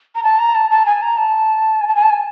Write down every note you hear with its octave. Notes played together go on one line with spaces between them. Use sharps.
A#5
A5
A#5
A5
A5
G#5
A#5
A5
G#5
A5
G#5
A5
G#5